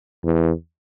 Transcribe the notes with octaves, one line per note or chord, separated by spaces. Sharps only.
E2